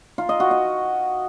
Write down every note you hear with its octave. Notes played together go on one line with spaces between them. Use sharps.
F4
D#5
F#4
D#5